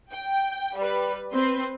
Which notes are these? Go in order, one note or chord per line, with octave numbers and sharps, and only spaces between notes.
G5
G3 B4
C4 B4 C6